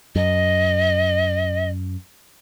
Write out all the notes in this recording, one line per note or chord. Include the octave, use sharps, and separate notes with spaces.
F#2 D#5